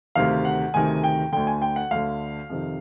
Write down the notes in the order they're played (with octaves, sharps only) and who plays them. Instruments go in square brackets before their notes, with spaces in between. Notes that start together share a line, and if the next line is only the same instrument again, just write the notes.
[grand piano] D2 C3 D#3 F5
F#5
D2 C3 D#3 G#5
G5
D2 D3 G5
G#5
G5
F#5
D2 D3 F5
F2 C3 D#3